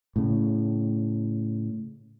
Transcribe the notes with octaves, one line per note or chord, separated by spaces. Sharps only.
A2 C#3